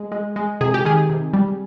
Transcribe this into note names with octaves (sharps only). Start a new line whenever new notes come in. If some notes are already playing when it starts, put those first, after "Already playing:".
Already playing: G#3
G#3
G#3
C3 G#4
G4
D#3 G#4
C3
G3